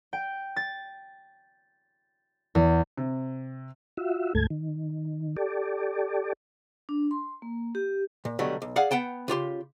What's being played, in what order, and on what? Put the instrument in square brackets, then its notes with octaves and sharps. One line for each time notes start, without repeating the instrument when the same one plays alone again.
[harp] G5
A6
E2
[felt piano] C3
[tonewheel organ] F4 F#4 E5
D2 G#2 A3 A4 G#6
D#3
G4 A4 D5
[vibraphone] D4
C6
A#3
G4
[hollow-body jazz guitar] A#2
B2 D3 F#3 G3 A3
B1
G#4 D5 F5 F#5
B3 F#5 G5 A5
C#3 F4 G4 C6